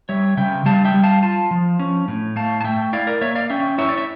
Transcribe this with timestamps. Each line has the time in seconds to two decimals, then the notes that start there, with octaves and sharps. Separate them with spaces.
0.09 G3 C#5 E5
0.37 C#3 E5 G5
0.66 G3 F5 A5
0.85 E5 G5
0.94 G3
1.04 F5 A5
1.23 F4 F5 A5
1.51 F3
1.79 C#4
2.08 A2
2.36 A3 F5 A5
2.61 A5
2.64 A3 E5 G5
2.93 E4 D5 F5
3.07 A#4 D5
3.21 A#3 C#5 E5
3.35 D5 F5
3.50 C#4 E5 G5
3.78 E4 C#5 E5
3.89 D5
3.98 E5